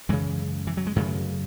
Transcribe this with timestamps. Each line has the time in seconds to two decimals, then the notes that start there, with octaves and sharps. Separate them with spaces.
0.09 F#2 C#3 E3 G#3
0.67 E3
0.77 F#3
0.87 G#3
0.96 F#2 C#3 F#3 A3